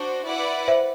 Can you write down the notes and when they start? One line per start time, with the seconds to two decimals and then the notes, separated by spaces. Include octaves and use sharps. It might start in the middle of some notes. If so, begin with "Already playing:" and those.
Already playing: D4 F#4 C5
0.25 E4 B4 D5 F#5
0.68 C5 E5